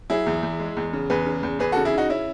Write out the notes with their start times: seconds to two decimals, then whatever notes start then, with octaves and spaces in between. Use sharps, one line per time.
0.10 F#3 E4 G#4
0.27 E2
0.43 E2
0.59 G#3
0.77 E2
0.93 C#3
1.10 E2 G#4 B4
1.26 C#3
1.43 E2
1.59 E2 G#4 B4
1.72 F#4 A4
1.77 C#3
1.85 E4 G#4
1.93 C#3 D#4 F#4
2.10 C#4 E4